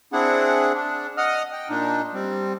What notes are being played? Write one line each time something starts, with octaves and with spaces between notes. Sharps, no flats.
C4 D4 E4 G#4 F#5
D4
D#5 F#5 D#6 F6
G5
A#2 D4 D#4
G3 C4